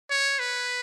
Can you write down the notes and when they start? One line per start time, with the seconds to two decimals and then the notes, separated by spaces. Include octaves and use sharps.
0.10 C#5
0.39 B4